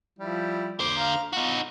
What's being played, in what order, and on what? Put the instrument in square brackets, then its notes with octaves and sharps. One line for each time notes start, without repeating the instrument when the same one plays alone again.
[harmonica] F3 G3 E4
[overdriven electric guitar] D3 C5 [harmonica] D6
[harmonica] F5 A#5
[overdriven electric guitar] D#4 F#4 [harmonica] F4